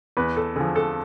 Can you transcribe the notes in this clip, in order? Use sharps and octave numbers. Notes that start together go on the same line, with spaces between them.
E2 B4
A4
D3 F3 G#4
A4